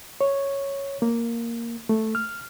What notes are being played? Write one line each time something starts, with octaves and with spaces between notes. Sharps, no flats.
C#5
A#3
A3
F6